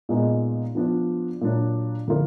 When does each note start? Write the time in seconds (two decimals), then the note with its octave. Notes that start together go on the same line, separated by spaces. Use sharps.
0.09 A#2 G#3 B3 D#4
0.75 F3 B3 D4 F4
1.41 A#2 F#3 D4
2.08 D3 F3 A#3 F4